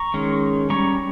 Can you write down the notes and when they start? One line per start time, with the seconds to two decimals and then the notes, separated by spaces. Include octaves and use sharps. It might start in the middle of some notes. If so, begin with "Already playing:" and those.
Already playing: A#5 C#6
0.14 D#3 G#3 C#4
0.70 G3 C#4 A#5 C#6